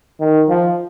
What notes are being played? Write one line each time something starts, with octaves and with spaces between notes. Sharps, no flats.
D#3
F3